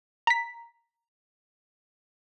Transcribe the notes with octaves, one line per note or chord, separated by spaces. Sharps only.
A#5 B6